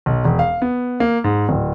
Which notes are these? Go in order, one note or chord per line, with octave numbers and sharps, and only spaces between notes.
B1
E1
F5
B3
A#3
G#2
D1